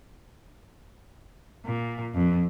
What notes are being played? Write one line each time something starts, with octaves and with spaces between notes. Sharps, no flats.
A#2
F2